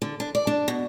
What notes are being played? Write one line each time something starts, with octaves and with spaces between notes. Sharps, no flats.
D3
D4
D5
D4
B2